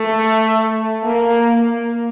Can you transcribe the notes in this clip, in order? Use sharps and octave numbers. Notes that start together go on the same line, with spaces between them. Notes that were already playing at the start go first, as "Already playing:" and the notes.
Already playing: A3
A#3
A#3